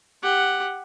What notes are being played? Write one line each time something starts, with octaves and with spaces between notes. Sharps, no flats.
G4 F#5